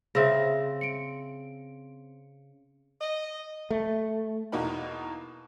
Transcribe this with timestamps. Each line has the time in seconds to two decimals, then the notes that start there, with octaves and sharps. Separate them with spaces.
0.15 C#3 C4 E5 E6 A#6
0.81 C#7 D7
3.01 D#5
3.70 A3
4.52 E2 B2 A#3 D#4 A#4 B5